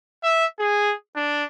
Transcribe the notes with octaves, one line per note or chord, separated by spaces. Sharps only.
E5
G#4
D4